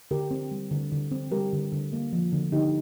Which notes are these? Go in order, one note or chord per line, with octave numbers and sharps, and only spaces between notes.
D3 G4 A#4
C4
G3
D3
D3
C4
G3 G4 A#4
D3
D3
A#3
F3
D3
D3 D#4 G4